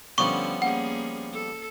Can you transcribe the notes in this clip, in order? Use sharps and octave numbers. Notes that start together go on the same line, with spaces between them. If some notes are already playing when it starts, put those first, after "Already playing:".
D3 F3 G3 B3 C#4 C#6
A#3 C#4 G#4 F#5
A4